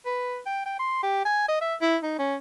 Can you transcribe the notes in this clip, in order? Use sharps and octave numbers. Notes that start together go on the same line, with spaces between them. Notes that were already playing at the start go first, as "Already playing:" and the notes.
B4
G5
G5
C6
G4
G#5
D#5
E5
E4
D#4
C#4